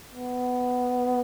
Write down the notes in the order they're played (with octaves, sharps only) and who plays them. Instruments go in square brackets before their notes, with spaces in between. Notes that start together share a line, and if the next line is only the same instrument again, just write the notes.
[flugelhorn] B3